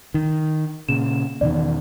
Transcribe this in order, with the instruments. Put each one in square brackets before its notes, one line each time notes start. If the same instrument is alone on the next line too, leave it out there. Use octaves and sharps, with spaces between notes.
[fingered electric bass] D#3
[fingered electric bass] A#2 C#3 [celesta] E7
[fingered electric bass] E2 B2 D#3 [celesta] D5